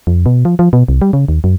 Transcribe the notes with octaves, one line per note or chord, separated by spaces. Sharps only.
F2
B2
F3
F3
B2
C2
G3
C#3
D#2
F#2